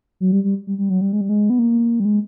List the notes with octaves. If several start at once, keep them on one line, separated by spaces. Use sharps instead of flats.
F#3
G3
G3
G3
G3
F#3
G3
G#3
G3
G#3
B3
A#3
G3
G#3